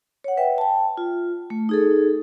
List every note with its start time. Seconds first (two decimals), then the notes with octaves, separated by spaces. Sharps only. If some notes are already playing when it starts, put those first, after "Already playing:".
0.24 C#5 F#5
0.37 B4 E5 G5
0.58 G5 A5
0.97 F4
1.50 A3
1.69 D#4 G#4 A4